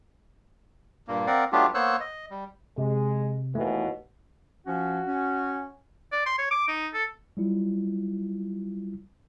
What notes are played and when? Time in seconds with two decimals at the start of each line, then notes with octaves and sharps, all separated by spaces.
1.08 G2 A#2 A#3
1.27 C4 A#4 D5 F5 F#5
1.52 F#3 A3 B3 D4 F4 G4
1.74 A#3 B3 C5 C#5 E6 F#6
2.00 D#5
2.31 G3
2.78 C3 G#3
3.55 D#2 B2 E3 A3
4.66 F3 C#4 F#4
5.07 C#4
6.12 D5
6.26 C6
6.38 C#5
6.51 D6
6.68 D#4
6.94 A4
7.37 F#3 G3 E4 F4